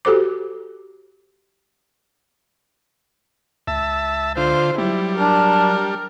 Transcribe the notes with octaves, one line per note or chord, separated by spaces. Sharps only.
F#4 G4 A4 C5 D6
C#2 E5 A5
D3 F4 C5
F#3 G3 E4
D4 A#4